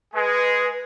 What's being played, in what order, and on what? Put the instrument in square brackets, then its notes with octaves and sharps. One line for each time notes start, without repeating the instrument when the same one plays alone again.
[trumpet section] G#3 G#4 [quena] B4